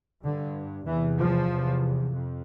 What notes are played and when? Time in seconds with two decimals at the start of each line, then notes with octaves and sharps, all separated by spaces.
0.23 G2 D3
0.86 E2 C3 E3
1.19 F3
1.50 E2 C3
2.13 F2